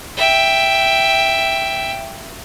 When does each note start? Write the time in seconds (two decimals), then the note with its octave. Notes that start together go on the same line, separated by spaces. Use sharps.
0.17 E5 G5